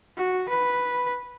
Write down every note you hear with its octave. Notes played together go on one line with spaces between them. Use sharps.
F#4
B4